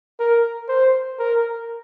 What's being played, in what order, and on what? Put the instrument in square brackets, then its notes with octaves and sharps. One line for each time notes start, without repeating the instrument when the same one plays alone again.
[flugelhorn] A#4
C5
A#4